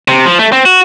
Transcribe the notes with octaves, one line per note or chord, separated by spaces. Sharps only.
C3
F3
A3
C4
F#4